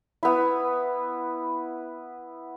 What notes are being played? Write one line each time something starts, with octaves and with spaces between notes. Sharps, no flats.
B3 E4